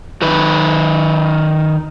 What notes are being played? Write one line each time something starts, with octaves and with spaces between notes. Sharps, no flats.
D#3 B4